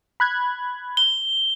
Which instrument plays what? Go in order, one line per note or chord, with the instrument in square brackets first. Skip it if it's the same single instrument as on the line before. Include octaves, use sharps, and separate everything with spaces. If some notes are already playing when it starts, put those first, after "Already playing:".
[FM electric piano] B5 F#6 G#6
[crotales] G7